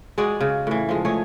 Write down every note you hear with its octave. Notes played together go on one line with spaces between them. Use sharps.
G#3 F#4 G#4 D5
C#3
A2 E3
F3 G#3
G#3 A3 G#4 C#5